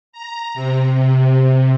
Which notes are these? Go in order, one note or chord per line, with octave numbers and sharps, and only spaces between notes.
A#5
C3
C3